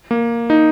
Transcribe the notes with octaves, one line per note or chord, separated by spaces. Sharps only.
A#3
D#4